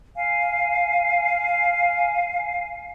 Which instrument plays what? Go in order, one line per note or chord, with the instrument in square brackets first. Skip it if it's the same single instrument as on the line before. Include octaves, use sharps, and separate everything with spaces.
[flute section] F5 G#5